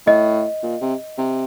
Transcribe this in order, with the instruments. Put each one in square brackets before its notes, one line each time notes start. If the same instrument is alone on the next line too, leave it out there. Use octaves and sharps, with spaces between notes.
[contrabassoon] A2 [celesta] D#5
[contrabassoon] A#2
C3
C3